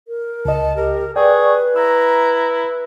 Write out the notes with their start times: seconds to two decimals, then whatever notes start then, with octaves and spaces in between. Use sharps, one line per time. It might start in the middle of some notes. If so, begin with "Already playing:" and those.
0.08 A#4
0.45 C#2 D#5 A5
0.76 G4 A#4
1.16 G#4 B4 D5 G5 C#6
1.76 E4 A#5 E6